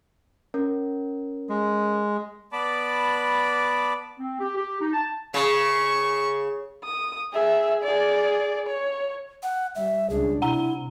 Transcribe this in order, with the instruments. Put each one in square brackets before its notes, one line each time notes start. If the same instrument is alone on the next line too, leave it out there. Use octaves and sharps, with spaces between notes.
[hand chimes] C#4 A#4
[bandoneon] G#3
[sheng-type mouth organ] B3 D5 A5 B5 D6
[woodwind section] C4
G4
G4
D#4
A5
[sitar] C#3 [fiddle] C#6
[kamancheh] D#6
G#4 E5
G#4 D5
C#5
[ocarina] F#5
[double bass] G3 [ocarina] E5
[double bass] C#2 D4 [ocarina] G#4
[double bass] C3 [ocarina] E4 [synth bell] F#5 A#5